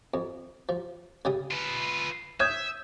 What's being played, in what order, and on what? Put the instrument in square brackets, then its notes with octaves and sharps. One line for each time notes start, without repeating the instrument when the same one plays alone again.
[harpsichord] F2
F3
C#3 G3 D#6
[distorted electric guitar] F4 B4
[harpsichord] C#5 [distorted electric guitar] E5 [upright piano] D#6 G6 G#6